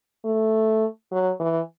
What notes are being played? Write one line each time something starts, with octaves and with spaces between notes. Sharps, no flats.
A3
F#3
E3